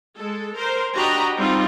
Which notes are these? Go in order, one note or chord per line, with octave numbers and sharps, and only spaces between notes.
G#3 A4
A#4 C5
D4 F#4 G4 D#5 A#5 B5
G3 C4 D#4 F4